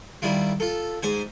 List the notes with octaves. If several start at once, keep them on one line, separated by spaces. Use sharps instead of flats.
D#3 G3 E4 F4
F4 A4
G#2 C5 G#5